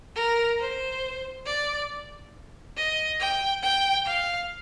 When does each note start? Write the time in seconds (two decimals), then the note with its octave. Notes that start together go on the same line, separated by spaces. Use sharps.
0.15 A#4
0.60 C5
1.46 D5
2.77 D#5
3.19 G5
3.62 G5
4.06 F5